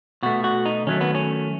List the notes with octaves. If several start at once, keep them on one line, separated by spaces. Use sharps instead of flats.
B2 A3 F#4
F#4
D#4
D#3 F#3 A3 C#4
B3
C#4